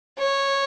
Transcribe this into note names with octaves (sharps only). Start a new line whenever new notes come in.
C#5